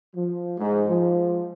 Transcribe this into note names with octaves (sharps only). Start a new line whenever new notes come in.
F3
G#2
F3